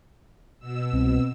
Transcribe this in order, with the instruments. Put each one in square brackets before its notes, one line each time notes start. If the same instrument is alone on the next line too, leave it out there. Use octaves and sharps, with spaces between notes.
[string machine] B2 E6
[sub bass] C2 [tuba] C4